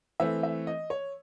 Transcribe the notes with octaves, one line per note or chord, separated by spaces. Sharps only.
E3 A3 C4 E5
E5
D#5
C#5